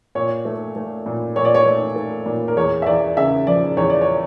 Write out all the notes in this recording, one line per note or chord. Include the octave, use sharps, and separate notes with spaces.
A#2 C#5
A3
A3
A#2
A#2 C#5
D5
C#5
A3
A3
A#2
A#4
E2 C#5
E5
E2 D5
C#3 E5
F3 D5
E2 C#5
D5
C#5